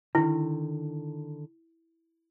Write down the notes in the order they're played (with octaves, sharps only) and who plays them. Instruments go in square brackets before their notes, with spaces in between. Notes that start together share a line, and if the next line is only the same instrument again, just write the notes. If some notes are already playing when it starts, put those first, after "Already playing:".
[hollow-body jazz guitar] D3 D#3 [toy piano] E4